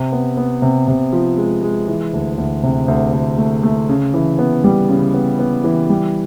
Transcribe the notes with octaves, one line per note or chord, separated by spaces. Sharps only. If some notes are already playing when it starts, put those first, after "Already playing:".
Already playing: C3
B3
B3
C3
C3
F3
G#3
G#3
E3
D2
D2
C3
D2
D2
A3
A3
C#3
E3
B3
G3
C#3
B3
B3
E3
G3